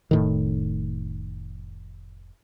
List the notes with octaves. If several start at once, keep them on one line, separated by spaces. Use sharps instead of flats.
F1 A2 D#3